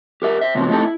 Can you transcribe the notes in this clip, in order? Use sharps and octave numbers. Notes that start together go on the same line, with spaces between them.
G4 A#4 E5
C5 E5
A2 C#3 F3 F#3 B3 C4
A3 C4 D#4 E4 G4 A4
E4